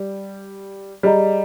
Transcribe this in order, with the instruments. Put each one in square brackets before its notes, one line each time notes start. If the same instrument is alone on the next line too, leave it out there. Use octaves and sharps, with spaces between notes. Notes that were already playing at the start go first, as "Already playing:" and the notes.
Already playing: [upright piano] G3
[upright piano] G3 [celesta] G#4 D#5 A#5